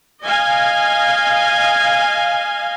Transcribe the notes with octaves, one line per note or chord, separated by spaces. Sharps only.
D#5 F5 G#5